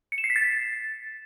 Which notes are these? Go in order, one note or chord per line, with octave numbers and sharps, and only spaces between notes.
C#7
E7
C7
B6
A6